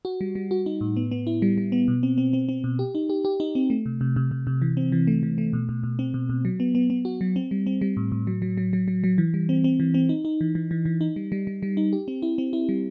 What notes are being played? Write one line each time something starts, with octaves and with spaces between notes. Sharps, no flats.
F#4
G3
G3
F#4
D#4
A2
B3
B3
E4
G3
G3
B3
B2
C4
C4
C4
C4
B2
G4
D#4
G4
G4
D#4
C4
A3
C3
C3
C3
C3
C3
E3
C4
E3
A3
E3
A3
B2
B2
B2
C4
B2
B2
F#3
B3
B3
B3
F#4
F#3
C4
G3
C4
G3
A2
A2
F#3
F#3
F#3
F#3
F#3
F#3
E3
G3
C4
C4
E3
C4
D#4
D#4
E3
E3
E3
E3
D#4
G3
G3
G3
G3
D#4
G4
C4
E4
C4
E4
G3